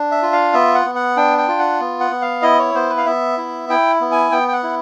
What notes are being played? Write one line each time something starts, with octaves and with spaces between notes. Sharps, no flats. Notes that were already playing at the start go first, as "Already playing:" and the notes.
Already playing: D4
E5
F4
F5
B3 E5
F#5
B3
F#5
D4 G5
G5
F4
F#5
B3
F#5
B3
F5
E4 D#5
C#5
B3 C5
B4
F5
B3 E5
E4
E4 G5
B3
G#5
B3 G5
G5
F#5
E4